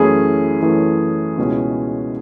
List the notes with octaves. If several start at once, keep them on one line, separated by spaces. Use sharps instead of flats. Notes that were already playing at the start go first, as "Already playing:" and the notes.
Already playing: F#2 E3 A3 C#4 E4 G#4
F#2 E3 A3 C#4 E4
C#2 B2 G#3 C#4 E4